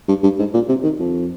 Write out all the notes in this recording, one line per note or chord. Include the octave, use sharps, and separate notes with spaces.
G2
G2
G#2
A#2
C3
D#3
F2